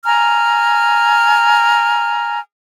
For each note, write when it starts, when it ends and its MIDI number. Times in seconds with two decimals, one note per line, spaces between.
0.05 2.39 80
0.05 2.39 82
0.05 2.39 89